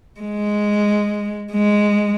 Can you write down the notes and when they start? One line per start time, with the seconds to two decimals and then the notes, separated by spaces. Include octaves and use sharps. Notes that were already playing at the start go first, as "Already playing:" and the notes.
0.20 G#3
1.52 G#3